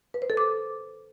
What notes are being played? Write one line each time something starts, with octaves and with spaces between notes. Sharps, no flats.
B4
C5
A4
D6